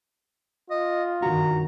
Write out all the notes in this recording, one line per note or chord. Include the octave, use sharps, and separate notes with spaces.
F4 D#5
G1 F#2 D#3 F#4 A#5